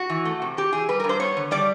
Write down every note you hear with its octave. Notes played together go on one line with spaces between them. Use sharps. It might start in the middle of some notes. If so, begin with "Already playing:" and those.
Already playing: F#4
E3
A3
C3
C3 G4
E3 G#4
G3 B4
A#4
G2
C5
B3 C#5
D3
G3 D5